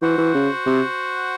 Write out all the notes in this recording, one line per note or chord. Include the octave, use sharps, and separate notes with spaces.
E3 F#4 C5 F#5
E3
C#3
C3